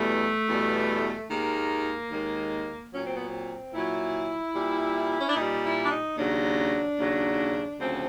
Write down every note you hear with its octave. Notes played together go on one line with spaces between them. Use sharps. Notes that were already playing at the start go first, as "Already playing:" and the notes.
Already playing: E2 B2 G3 A3
E2 B2 G3
D#2 D#3 G#3 A#3
D#2 D#3 G#3
A#2 F#3 C#4
C4
B3
C4
A#2 F#3 E4
A#2 G3
C#4
D4
A#2 G3 D#4
E4
D4
D#4
D#2 C#3 F#3 D4
D#2 C#3 F#3
D2 C#3 F3 C4